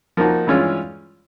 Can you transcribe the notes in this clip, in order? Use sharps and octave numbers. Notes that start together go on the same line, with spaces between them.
F3 A#3 D#4 F#4
G2 E3 G#3 C#4 F4